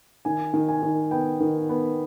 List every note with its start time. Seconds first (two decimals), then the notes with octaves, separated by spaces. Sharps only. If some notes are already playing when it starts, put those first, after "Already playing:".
0.25 D#3 G#5
0.54 D#3
0.68 G#5
0.83 D#3
1.11 B3 G5
1.40 D#3
1.69 B3